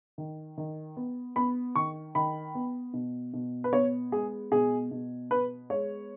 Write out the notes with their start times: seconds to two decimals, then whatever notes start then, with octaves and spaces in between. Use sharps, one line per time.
0.18 D#3
0.58 D#3
0.97 B3
1.36 B3 B5
1.76 D#3 C#6
2.15 D#3 B5
2.55 B3
2.93 B2
3.33 B2
3.64 B4
3.73 B3 C#5
4.12 G#3 G#4
4.52 B2 G#4
4.91 B2
5.30 B3 B4
5.70 G#3 C#5